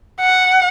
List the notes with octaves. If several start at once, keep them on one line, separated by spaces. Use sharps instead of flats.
F#5